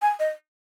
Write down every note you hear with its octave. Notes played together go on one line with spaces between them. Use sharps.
G#5
D#5